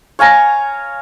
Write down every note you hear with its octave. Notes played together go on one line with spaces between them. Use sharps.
C#5 F5 G#5 A#5